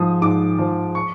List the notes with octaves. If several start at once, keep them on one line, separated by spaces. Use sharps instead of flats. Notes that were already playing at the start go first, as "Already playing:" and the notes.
Already playing: G#2 F3 D#6
G#2 D6
F3
C#6